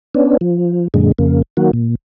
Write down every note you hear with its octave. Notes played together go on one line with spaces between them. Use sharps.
B3 C#4 D4
F3
F#2 A#2 D3 G#3
F2 C#3 A#3
D#3 F#3 A#3 F#4
A#2